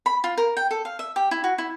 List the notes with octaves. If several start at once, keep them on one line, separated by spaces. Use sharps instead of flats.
B5
F4
A#4
G5
A4
F5
E5
G4
E4
F#4
E4